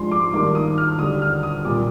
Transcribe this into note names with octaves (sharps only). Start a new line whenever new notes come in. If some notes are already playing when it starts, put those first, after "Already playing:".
Already playing: G#2 F3 G#3 D4 C6
D6
G2 D#3 A#3 D4 D6
D#6
F6
D#2 D3 G3 D4 D#6
F6
D#6
C2 A#2 G3 D6